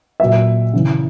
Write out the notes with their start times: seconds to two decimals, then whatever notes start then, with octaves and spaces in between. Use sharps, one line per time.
0.20 A#2 F#3 E5
0.73 C#3 E3